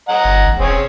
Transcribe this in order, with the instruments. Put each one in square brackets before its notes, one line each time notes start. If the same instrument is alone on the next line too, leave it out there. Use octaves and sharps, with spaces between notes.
[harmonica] D#5 F#5 A#5
[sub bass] G1
A1
[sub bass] E1 [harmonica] C4 G#4 C#5